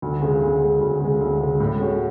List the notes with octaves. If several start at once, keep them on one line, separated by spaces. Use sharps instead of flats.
D2
C#3 G#3
D2
C#3 G#3
D2
C#3 G#3
D2
C#3 G#3
A2
G#3 C#4 F#4